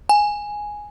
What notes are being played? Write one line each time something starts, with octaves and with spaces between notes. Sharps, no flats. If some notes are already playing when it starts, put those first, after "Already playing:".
G#5